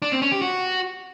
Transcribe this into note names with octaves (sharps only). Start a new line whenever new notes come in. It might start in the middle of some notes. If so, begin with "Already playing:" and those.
D4
C4
C#4
G4
F#4